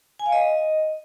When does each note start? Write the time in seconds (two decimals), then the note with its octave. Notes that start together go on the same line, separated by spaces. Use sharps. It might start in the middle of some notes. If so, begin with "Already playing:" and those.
0.19 G#5
0.26 F5
0.32 D#5